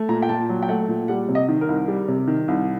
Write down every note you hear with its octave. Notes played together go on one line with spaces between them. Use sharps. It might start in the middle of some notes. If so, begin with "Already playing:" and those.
Already playing: A3
A#2 A#5
G5
A#2 A5
F#3
G5
A3 F#5
A#2
G3 F#5
C3
D#5
D#3
A#4
C2
G3
C3
D#3
C2